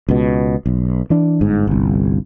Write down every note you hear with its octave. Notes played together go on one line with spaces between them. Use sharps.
C#2 B2
B1
E3 D4
G1 G#2
G1 C2